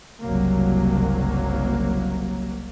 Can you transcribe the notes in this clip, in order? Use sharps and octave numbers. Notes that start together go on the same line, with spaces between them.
F#1 C2 F#3 A#3